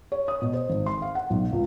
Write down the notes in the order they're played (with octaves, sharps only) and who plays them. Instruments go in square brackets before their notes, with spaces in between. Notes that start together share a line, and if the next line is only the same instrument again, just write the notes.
[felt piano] C#5
D#6
B2
C5
G#1
C6
F5
F#5
B1
C#2